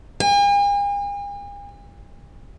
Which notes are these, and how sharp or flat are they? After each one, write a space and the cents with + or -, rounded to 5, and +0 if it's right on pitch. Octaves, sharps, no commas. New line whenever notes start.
G#5 -45